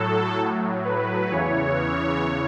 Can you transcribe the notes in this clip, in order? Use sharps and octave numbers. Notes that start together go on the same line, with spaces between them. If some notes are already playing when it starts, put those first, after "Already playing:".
Already playing: A2 F#3 A4
A2 F#3
B4
E2 C#3 E3 C#5